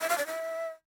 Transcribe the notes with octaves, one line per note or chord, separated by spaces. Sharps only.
E5
F5
D5
E5